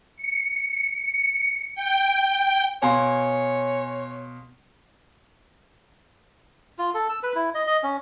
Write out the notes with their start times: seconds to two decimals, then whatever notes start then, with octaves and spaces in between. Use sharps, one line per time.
0.17 C#7
1.75 G5
2.83 B2 C#5 F5 G#5 C6
6.79 F4
6.94 A4
7.09 E6
7.23 B4
7.35 E4
7.55 D#5
7.67 D#5
7.83 C#4